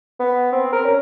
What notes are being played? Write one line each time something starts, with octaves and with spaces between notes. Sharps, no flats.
B3
C4
A#4
C#4